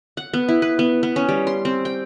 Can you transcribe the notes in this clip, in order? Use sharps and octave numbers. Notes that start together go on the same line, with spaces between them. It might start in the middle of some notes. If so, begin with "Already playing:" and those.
F#5
B3
E4
B4
B3
B3
C#4
G3
C6
C4
G5